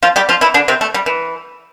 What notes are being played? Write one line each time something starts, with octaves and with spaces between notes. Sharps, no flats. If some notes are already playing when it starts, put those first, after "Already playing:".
F3 F4
G3 G4
F3 F4
E3 E4
D3 D4
C3 C4
A3
G3
E3